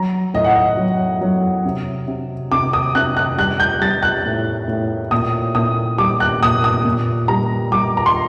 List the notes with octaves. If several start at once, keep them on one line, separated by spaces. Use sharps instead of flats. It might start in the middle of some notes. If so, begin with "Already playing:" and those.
Already playing: F#3 A#5
A2 D#5
F#5
D#5
F#3
F#3
C3
C3
C3 D6
D#6
C3 F#6
F#6
G3 F#6
G6
G3 A6
F#6
A2
A2
A#2 D#6
A#2 D#6
G3 D6
F#6
A#2 D#6
D#6
A#2
G3 A#5
G3 D6
A#5
C6